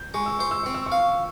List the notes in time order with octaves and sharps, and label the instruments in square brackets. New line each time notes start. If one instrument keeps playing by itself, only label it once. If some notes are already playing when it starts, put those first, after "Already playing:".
Already playing: [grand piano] G6
[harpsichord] G#3 [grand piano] C#6
[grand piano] E6
[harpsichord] C5 [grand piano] C#6
[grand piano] E6
[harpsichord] C4 [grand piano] C#6
[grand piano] E6
C#6
[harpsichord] F5